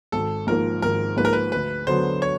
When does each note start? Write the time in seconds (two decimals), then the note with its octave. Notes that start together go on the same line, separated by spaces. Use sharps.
0.12 G#1 A4
0.47 G#2 F3 A#3 A#4
0.82 G#1 A#4
1.17 G#2 F3 A#3 B4
1.25 A#4
1.33 B4
1.52 D2 B4
1.87 D3 F#3 B3 C5
2.22 C#5